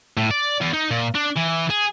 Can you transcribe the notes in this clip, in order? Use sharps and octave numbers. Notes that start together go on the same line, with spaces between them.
A2
D5
E2
D#4
A#2
D4
E3
G#4